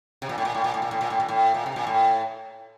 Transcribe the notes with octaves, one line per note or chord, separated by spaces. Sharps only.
C3
A#2
A2
A#2
A2
A#2
A2
A#2
A2
A#2
A2
A#2
A2
A#2
C3
A#2
A2